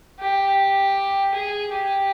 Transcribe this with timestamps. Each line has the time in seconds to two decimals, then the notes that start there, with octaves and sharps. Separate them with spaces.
0.20 G4
1.34 G#4
1.72 G4